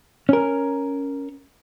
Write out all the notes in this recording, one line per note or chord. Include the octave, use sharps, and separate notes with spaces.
C#4 A#4